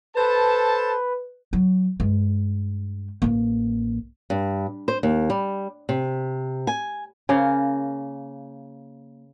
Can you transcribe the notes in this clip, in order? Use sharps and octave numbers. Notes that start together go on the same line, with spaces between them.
A4 B4 C5 A5
F#3
G2 G#3
A1 A#3
G2
C5
D#2
G3
C3
G#5
C#3 A#3 F5